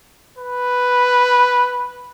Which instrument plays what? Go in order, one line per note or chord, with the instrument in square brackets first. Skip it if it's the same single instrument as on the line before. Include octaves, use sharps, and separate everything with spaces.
[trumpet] B4